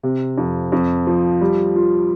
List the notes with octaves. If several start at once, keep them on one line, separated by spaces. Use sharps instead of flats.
C3
F2
F2
F3
G3
F4